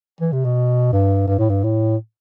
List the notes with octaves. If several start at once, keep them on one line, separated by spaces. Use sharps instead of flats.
E3
C3
B2
G2
G2
A2
G2
A2